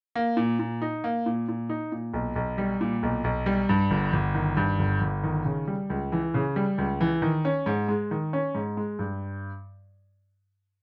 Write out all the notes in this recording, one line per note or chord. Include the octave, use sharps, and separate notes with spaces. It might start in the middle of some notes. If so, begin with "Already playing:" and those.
A#3
A#2
A#2
D#4
A#3
A#2
A#2
D#4
A#2
B1
B1
G3
A#2
B1
B1
G3
G2
G1
G1
D#3
G2
G1
G1
D#3
C#3
G3
C#2
E3
C#3
G3
C#2
E3
D#3
C#4
G#2
G#3
D#3
C#4
G#2
G#3
G2